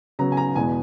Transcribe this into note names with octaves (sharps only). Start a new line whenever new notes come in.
C#3 F#3 B3 A#5
G#5
A#5
E2 B2 G#3 B3 G#5